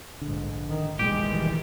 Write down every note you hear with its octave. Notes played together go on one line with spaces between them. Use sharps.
A#1 G#2 D3
D#3
F1 B1 A#2 D#3 E3 G3 G#3 G4